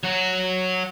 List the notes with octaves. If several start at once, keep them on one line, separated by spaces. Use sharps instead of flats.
F#3 F#4